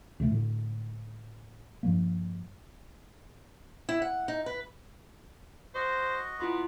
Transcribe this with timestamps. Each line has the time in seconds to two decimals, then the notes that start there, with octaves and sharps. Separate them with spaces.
0.20 D2 C3 G3 A3
0.31 A2 D3
1.83 G2 F3 G3 A#3
3.89 E4
4.02 F#5
4.28 D#4
4.46 B4
5.75 F#4 C5 D#5 C#6
6.40 B3 E4 F4 C6